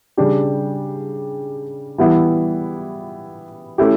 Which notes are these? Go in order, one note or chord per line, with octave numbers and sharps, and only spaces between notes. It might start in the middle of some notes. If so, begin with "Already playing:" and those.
C#3 G3 D4 G4
E3 G3 B3 E4
A3 C#4 E4 G4